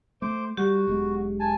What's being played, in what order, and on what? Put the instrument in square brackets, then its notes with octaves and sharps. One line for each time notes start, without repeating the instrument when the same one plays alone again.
[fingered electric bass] A3 [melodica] C5 D6
[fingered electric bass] G3 [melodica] F#4 [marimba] G4
[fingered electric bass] E1 B1 G#3
[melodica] G#5 A5